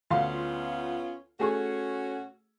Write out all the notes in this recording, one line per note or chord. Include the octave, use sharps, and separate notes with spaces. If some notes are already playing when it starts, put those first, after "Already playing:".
D2 B3 C#4 F4 F5 C6
A3 C#4 F#4 G#4 C#6